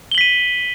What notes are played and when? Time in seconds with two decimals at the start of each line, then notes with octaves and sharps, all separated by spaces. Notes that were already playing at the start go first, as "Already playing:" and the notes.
0.11 G7
0.15 F#7
0.18 B6
0.21 D#7